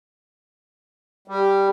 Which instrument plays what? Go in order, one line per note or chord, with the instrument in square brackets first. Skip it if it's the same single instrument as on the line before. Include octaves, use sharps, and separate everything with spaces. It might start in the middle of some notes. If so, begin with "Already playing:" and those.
[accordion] G3